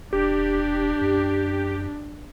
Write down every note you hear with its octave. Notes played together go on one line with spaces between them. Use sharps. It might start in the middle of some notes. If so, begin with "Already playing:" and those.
E1 D4 G4
F#2